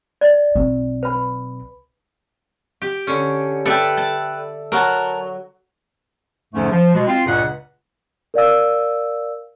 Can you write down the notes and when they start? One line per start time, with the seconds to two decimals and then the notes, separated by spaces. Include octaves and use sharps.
0.21 D5
0.55 B1 C4
1.03 B4 B5
2.82 G4
3.07 D3 C#4
3.66 A4 B4 D5 E5 G5
3.97 A5
4.72 F#3 A#4 F#5 A5
6.54 E2 G#2 D3 F3 A3 C#4
6.72 F3
6.94 B2 G#3
7.07 C4 F4
7.26 C#2 G2 A#2 C#3 F#5
8.34 A#4 D5 F5 E6